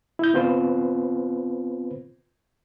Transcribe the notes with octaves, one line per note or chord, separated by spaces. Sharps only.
E4 G6
B3 C4 F4 B4 C5